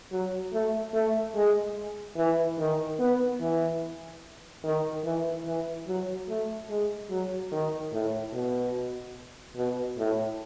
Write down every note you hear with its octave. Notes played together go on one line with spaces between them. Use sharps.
F#3
A3
A3
G#3
E3
D#3
B3
E3
D#3
E3
E3
F#3
A3
G#3
F#3
D#3
A2
B2
B2
A2